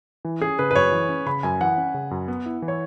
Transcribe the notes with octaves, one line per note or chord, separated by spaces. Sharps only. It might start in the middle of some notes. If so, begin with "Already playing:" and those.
E3
C#4 G#4
C#3 B4
B4
F#2 C#5
E3
C#4
C#3 B5
F#2 G#5
E3 F#5
C#4
C#3
F#2
B3
E4
E3
C#5